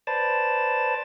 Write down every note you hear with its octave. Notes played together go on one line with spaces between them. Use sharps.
B4 C5 D5 A5